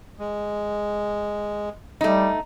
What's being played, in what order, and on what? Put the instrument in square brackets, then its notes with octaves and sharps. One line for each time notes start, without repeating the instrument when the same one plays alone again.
[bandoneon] G#3
[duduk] G3 [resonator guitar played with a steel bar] A3 D#4